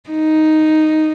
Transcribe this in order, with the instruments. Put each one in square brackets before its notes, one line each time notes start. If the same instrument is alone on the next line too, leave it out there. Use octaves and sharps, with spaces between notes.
[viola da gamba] D#4